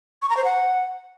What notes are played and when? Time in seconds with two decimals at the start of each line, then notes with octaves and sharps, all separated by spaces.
0.22 C#6
0.29 A#5
0.37 C5
0.44 F#5